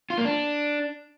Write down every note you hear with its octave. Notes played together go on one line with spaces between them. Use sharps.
F4
A#3
D4